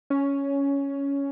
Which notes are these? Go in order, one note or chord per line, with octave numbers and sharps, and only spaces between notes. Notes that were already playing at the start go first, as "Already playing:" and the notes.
C#4